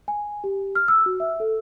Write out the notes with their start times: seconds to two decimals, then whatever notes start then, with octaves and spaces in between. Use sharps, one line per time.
0.08 G#5
0.44 G4
0.75 F6
0.88 E6
1.06 F#4
1.20 E5
1.40 A4